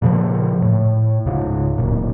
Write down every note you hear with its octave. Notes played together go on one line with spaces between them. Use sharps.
A#2 C#3 E3 F3
A2
C#2 G#2 C#3
D1 A#2